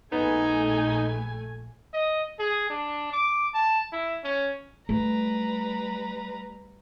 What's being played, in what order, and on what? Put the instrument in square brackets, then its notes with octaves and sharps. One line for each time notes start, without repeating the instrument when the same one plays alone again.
[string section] A#1 A3 G#5 [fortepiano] B3 [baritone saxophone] D#4
[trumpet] D#5
G#4
D4
D6
A5
E4
C#4
[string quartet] G3 B4 A#5 [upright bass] A3